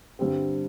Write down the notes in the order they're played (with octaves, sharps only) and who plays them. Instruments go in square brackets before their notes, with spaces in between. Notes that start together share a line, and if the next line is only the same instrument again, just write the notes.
[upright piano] G2 D3 G3 C4